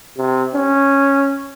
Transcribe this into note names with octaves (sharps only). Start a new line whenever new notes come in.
C3
C#4